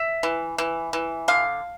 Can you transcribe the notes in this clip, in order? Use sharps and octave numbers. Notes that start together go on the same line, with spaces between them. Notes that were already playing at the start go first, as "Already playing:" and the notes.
Already playing: E5
E3
E3
E3
D3 F5